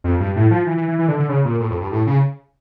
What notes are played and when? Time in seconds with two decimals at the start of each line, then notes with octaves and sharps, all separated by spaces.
0.04 F2
0.20 G2
0.36 A2
0.51 F3
0.67 E3
0.77 E3
0.88 E3
0.99 E3
1.08 D3
1.19 D3
1.29 C#3
1.45 A#2
1.60 A2
1.70 F2
1.81 G2
1.92 A2
2.07 C#3